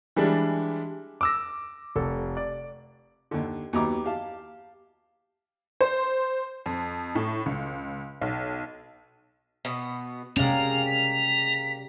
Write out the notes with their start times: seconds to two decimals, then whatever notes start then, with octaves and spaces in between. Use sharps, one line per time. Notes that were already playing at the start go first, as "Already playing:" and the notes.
0.16 E3 G3 G#3 D4
1.21 D6 E6 A#6
1.96 F1 A4
2.37 D5
3.31 D#2 D3
3.73 D#2 F#3 B3 A#5 D6
4.04 G4 F5 A5
5.81 C5
6.66 F2
7.15 A2
7.46 C#2
8.21 B1
9.65 B2 B3
10.37 C3 G3 G#3 A#3 C#4 F5 A#5
10.86 B6